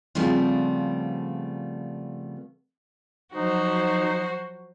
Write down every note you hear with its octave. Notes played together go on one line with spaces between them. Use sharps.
C#3 F3 G3 A3 B3 C4
F3 F#3 D#4 F#4 C5